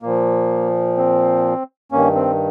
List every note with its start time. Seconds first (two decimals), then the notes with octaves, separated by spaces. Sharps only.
0.02 A#2 F3 A#3
0.97 C4
1.92 G2 D#3 A#3 C#4
2.15 C4